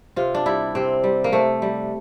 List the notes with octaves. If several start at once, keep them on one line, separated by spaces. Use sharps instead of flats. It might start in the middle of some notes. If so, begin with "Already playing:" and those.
C3 F4
D4
G3 E4
C3 C4
G3
A#3
C3 A3
G3